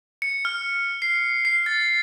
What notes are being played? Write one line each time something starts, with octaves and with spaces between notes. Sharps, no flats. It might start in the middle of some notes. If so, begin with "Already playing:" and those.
C#7
F6
C7
C7
A6